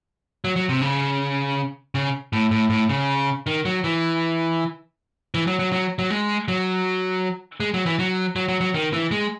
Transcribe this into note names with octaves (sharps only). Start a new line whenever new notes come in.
F#3
F#3
C3
C#3
C#3
A2
A2
A2
C#3
D#3
F#3
E3
E3
F#3
F#3
F#3
F#3
G#3
F#3
G#3
F#3
E3
F#3
F#3
F#3
F#3
D#3
E3
G#3